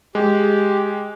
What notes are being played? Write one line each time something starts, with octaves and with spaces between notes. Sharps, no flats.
G#3 G4